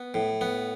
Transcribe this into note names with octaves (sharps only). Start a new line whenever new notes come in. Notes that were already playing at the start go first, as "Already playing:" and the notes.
Already playing: B3
A2
B3